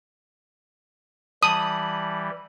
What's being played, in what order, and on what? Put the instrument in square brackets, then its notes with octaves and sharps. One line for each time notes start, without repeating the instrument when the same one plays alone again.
[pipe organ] E3 G3 [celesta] A5 F#7 [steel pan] D#6